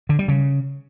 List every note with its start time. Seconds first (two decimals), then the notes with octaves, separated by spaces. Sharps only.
0.09 D3
0.19 G3
0.28 C#3